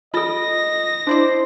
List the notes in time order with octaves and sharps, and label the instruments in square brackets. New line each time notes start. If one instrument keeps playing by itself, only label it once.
[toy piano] F4 A4 [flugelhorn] D#5 [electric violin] A#6
[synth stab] D4 E4 D5 [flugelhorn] C5